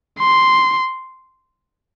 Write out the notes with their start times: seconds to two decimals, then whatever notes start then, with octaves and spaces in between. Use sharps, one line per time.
0.20 C6